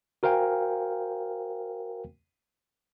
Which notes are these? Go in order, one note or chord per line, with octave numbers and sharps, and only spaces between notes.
F#4 A#4 C5 F5 G5 G#5